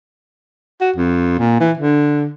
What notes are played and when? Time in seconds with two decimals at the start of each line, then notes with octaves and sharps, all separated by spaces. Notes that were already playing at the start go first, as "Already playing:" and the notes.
0.81 F#4
0.96 F2
1.39 A#2
1.60 E3
1.77 D3